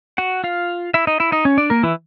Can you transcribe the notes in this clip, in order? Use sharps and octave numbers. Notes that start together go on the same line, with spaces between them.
F#4 F#5
F4 F5
E4 E5
D#4 D#5
E4 E5
D#4 D#5
C#4 C#5
D4 D5
A#3 A#4
E3 E4